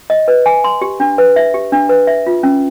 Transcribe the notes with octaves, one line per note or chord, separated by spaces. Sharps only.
D#5
B4
G#5
C6
G4
D4
B4
E5
G4
D4
B4
E5
F4
C#4